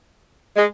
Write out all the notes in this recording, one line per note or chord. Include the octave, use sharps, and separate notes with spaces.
G#3